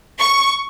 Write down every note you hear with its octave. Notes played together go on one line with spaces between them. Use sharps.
C#6